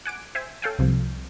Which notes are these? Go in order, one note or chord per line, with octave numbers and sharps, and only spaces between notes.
F#5 G#5 D6 D7
C5 E5 G5 G#5
A4 C#5 F5 G5 G#5
C2 C3 F3